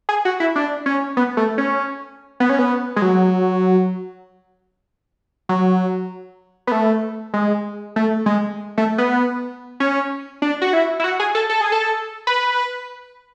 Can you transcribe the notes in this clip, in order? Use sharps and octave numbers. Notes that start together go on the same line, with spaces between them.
G#4
F#4
E4
D4
C#4
B3
A3
C#4
B3
C#4
B3
G#3
F#3
F#3
B3
A3
G#3
A3
G#3
A3
B3
C#4
D4
F#4
E4
E4
F#4
G#4
A4
A4
G#4
A4
B4